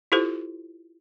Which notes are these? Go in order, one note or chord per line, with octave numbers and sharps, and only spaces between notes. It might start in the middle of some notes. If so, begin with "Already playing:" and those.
E4 F4 G4 A4 C5